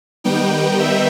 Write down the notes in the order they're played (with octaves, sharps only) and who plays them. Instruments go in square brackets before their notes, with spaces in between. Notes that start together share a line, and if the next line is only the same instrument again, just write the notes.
[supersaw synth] D#3 G3 B3 D#4 G5
E5